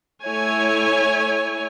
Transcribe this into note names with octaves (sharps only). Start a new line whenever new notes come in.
A3 E4 C#5 G#5